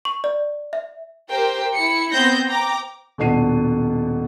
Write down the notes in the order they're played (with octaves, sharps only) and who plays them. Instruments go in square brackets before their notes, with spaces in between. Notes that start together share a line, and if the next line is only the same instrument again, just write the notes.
[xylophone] C#6
D5
E5
[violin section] G4 A#4 C5 G5
E4 C#7
B3 C4 C5 G6 A#6
G5 A#5 D6
[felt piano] D#1 B2 D4 F#5 C7 D#7